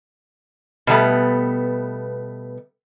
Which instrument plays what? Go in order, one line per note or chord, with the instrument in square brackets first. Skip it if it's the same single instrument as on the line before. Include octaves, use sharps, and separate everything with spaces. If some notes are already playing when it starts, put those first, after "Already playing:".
[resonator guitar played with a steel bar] B2 G3 A3 B3